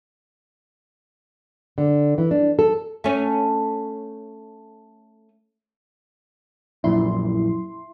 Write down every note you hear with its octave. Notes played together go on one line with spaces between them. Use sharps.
D3
E3
D4
A4
A3 C#4
A#1 F#2 A#2 E4 C6